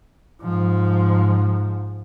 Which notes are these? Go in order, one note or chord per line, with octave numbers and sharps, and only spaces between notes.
G#2 F3